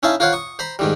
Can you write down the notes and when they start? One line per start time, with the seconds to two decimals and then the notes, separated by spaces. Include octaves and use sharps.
0.03 C#4 D#4 E4 F5 A5
0.20 F4 A#4 C5 C#5 F5 F#5
0.33 C#6 D#6
0.59 C5 A#5 B5
0.79 G#2 D#3 G3